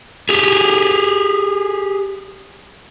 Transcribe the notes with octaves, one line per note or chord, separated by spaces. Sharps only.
G4 G#4